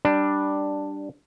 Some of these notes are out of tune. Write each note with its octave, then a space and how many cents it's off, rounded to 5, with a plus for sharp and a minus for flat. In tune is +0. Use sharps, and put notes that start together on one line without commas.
G3 +0 D4 +5